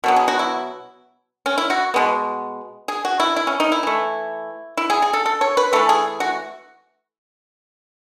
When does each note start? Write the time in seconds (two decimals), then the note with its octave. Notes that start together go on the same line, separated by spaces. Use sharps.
0.04 B2 F#3 B3
0.16 G#4
0.28 F#4
0.39 E4
1.46 C#4
1.58 E4
1.70 F#4
1.94 B2 G#3 B3
2.88 G#4
3.05 F#4
3.20 E4
3.36 E4
3.47 C#4
3.60 D#4
3.72 E4
3.83 E3 A3
4.77 E4
4.90 G#4
5.02 G#4
5.13 A4
5.26 A4
5.41 C#5
5.57 B4
5.73 E3 A3 A4
5.89 G#4
6.20 F#4